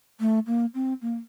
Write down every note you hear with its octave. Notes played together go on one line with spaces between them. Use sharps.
A3
A#3
C4
A#3